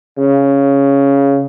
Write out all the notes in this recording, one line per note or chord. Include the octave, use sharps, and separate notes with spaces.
C#3